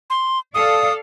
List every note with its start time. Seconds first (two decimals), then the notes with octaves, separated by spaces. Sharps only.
0.10 C6
0.54 A4 D5 F5 D#6